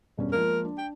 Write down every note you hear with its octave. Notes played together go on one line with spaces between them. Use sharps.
E1 G2 C#4
F3 G#3 A#3 A#4
D4
G5